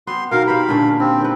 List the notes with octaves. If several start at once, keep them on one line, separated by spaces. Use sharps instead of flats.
B3 C4 C6
B2 D#3 A#4 F5
G4 C5 F5 B5
A#2 D3 C#4
C4 G4
D#3 B4